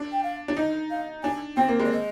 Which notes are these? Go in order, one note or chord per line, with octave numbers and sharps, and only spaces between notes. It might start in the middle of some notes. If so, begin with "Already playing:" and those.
Already playing: D4
G5
F5
D4
D#4 D#5
F5
D4 G#5
C4 G5
A#3
G#3
D5
D#5